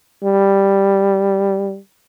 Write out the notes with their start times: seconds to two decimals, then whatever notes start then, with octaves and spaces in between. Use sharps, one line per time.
0.24 G3